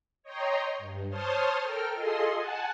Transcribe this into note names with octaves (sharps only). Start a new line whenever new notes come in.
C#5 D#5 G5 A#5 C6
G2
C5 C#5 A5 C6 D#6 F6
A4 A#4 G5 F6
F4 G#4 A4 D#5 C6
F#5 G#5 A5